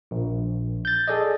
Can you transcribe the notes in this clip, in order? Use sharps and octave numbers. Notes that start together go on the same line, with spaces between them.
A#1
G6 A6
G#4 A4 D5 D#5